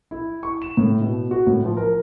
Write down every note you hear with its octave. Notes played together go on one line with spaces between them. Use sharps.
E4
C#6
E7
A2
B2
F#4
A2
F3
A#4